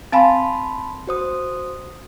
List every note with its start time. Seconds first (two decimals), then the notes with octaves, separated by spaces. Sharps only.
0.12 C4 F5 G#5 A5 B5 C6
1.07 F#4 C5 D#6